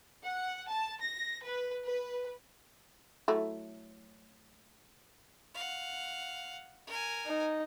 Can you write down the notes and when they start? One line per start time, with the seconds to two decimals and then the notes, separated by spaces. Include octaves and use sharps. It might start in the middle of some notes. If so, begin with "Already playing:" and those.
0.24 F#5
0.67 A5
1.01 A#6
1.43 B4
1.85 B4
3.28 F#3 A3 E4
5.55 F5 F#5
6.87 A#4 G#5
7.26 D#4